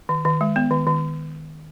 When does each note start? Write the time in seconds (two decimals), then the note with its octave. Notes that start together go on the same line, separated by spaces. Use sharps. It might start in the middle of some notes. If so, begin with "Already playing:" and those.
0.09 D#3
0.25 D#3
0.41 G#3
0.56 B3
0.71 D#3
0.87 D#3